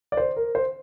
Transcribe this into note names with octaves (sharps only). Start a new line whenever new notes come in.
D5
C5
A#4
C5